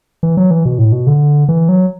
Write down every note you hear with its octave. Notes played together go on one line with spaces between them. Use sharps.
E3
F#3
E3
B2
A2
B2
D3
E3
F#3